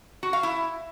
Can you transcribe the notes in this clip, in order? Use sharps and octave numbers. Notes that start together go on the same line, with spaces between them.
F#4
F5
E4